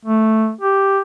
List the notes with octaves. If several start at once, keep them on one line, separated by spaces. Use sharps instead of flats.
A3
G4